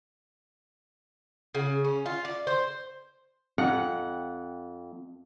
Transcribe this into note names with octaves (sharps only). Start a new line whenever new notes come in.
C#3
C#4
F4
D5
C5
F2 F#5